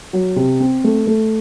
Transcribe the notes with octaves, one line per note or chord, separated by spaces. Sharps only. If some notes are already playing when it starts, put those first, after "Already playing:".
F#3
C3
C4
A3
A3